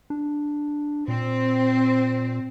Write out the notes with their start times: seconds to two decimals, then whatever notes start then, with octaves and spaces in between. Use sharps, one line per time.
0.10 D4
1.08 A#2 C4